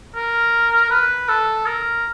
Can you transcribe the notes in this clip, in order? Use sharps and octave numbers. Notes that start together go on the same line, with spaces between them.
A#4
B4
A4
A#4